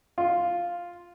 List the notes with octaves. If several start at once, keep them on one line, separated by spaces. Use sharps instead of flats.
F4